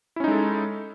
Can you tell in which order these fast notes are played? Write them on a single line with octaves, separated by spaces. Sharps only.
E4 C#4 D#4 G#3 A4